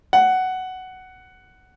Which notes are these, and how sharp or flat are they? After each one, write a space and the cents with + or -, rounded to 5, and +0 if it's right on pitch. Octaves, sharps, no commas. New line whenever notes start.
F#5 +10